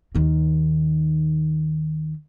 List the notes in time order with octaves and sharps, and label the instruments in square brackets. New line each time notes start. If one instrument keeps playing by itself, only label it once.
[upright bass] D#2 D#3